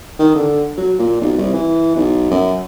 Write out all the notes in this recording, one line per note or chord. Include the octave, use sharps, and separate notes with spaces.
D#3
D3
F#3
A#2
B1
C2
E3
B1
F#2